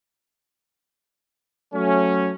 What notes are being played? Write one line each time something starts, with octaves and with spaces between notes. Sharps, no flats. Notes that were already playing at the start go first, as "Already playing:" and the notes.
F#3 A3 C#4